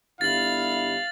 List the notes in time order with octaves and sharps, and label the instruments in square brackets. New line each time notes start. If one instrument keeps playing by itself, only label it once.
[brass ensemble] G1 E4 [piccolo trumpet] F5 [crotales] A6 F#7